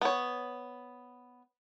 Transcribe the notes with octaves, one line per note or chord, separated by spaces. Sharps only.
B3 C#5